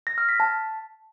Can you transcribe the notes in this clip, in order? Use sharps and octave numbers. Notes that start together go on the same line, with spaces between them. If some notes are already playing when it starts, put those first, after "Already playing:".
A#6
F6
B6
A5